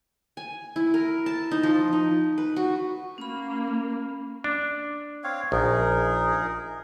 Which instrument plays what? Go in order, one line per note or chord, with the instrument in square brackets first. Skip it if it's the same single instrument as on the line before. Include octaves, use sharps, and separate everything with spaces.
[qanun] G#5
E4
A#4
A5
D#4
F3
D#4
B4
F#4
[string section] A#3 [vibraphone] C#4 B5
[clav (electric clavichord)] D4
[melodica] C4 C#5 F5
[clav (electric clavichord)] A#1 [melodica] D#4 G#4 A#4